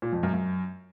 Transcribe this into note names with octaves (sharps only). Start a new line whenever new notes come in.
A#2
F2
F#2
F#2